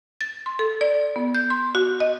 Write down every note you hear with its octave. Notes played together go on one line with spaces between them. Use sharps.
A6
C6
A4
D5
B3
G6
C6
F#4
D#5